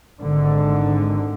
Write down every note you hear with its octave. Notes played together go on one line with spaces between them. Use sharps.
G#1 G#2 D3